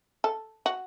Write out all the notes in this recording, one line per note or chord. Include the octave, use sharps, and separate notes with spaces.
A4
F#4